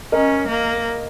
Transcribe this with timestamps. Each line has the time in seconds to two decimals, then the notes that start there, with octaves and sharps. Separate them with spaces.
0.12 C#4 A#4 D#5
0.48 A#3